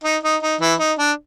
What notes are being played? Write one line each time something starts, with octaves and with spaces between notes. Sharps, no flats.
D#4
D#4
D#4
E3 E4
D#4
D4